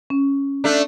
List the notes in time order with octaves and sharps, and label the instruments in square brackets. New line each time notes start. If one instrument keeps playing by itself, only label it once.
[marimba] C#4
[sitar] A3 D4